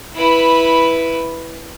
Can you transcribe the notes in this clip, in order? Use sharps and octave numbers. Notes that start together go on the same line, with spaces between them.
E4 B4